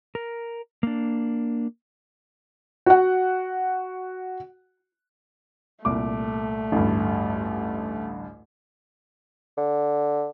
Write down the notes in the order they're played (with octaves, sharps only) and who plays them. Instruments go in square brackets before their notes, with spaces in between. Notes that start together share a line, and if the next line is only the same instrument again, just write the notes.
[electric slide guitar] A#4
A#3 D4
[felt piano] F#4 F#5
[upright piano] C2 A#2 D6 [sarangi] A3
[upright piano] A1 D2 G2
[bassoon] D3